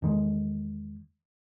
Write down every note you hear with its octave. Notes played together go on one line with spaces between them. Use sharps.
E2 D#3 G#3